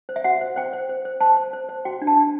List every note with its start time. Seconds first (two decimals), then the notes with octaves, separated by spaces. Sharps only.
0.09 C5
0.16 E5
0.24 F#4 F#5
0.41 C5
0.56 C5 G5
0.73 C5
0.89 C5
1.05 C5
1.21 C5 A5
1.37 C5
1.53 C5
1.69 C5
1.85 F#4 G5
2.02 D4
2.07 A5
2.17 D4